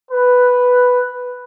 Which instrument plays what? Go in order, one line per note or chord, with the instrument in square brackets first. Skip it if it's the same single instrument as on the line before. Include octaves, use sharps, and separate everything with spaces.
[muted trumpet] B4